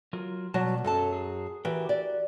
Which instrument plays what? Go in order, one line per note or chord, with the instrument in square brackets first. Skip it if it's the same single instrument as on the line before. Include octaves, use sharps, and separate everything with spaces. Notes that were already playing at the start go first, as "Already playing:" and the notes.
[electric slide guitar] F#3 F4 A#4
[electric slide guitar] B2 G3 A5 [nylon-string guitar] F#3
[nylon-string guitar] F#2 F#3 A5 [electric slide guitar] A4
[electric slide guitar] G#4
[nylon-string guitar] E3 [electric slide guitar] F#4 G4 A#4
[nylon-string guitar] D5